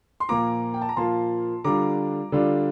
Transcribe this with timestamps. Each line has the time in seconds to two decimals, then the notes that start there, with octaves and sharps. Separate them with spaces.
0.20 C6
0.29 A#2 F3 A#3 F4 A#5 D6
0.74 G5
0.82 A5
0.89 A#5
0.96 A#2 F3 A#3 F4 A5 C6
1.64 D3 G3 D4 F4 A#5 D6
2.32 D3 G3 D4 F4